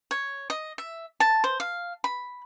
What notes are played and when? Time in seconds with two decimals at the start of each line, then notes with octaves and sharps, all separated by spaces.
0.11 C#5
0.50 D#5
0.78 E5
1.20 A5
1.44 C5
1.60 F5
2.04 B5